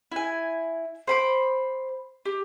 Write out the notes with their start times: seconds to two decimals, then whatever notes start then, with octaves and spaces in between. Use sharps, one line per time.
0.12 E4 G#5
1.07 C5 B5 D6
2.25 G4